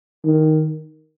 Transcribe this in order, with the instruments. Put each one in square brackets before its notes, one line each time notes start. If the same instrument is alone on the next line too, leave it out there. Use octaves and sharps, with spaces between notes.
[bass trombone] D#3